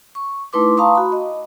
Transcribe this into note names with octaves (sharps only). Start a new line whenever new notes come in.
C#6
A3 D#4 E4 B4 C6 D6
F5 A5 A#5 C6 C#6 D#6
F#4 B5
D#5